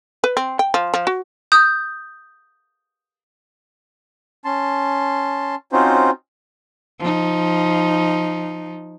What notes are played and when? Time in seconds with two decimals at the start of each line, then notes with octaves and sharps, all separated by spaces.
0.24 B4
0.37 C4
0.59 G5
0.74 F3
0.94 F3
1.07 F#4
1.52 D#6 G6
4.45 C#4 A5 C6
5.72 C4 C#4 D#4 F4 F#4 C5
6.99 F3 D#4